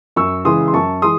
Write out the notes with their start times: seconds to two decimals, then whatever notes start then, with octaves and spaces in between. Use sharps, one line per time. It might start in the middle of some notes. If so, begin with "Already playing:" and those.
0.16 F#2 C#6 E6
0.45 C#3 E3 G#3 C6 D#6
0.68 C6
0.74 F#2 A5 C#6
1.02 E3 G#3 C6 D#6